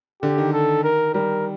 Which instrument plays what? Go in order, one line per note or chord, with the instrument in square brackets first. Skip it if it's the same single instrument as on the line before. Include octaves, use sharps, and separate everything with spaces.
[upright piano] D3 [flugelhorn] G4
[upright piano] D#3
[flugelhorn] A4
A#4
[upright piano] G3 [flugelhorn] A#4